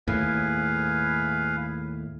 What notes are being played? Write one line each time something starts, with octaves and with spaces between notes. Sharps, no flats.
D#2 A2 G#4 B4 F5